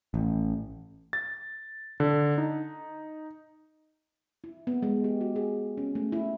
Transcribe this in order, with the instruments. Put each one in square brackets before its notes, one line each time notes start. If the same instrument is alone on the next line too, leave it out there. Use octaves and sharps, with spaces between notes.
[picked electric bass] A1
[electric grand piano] A6
D3
D#4
[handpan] E4
B3
G#3
G4
F#4
G#4
C#4
A3
E4